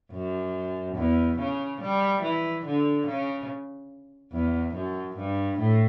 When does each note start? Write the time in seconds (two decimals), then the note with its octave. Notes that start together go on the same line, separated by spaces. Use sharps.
0.12 F#2
0.96 E2
1.39 C#3
1.81 G3
2.22 E3
2.65 D3
3.06 C#3
4.32 E2
4.74 F#2
5.17 G2
5.58 A2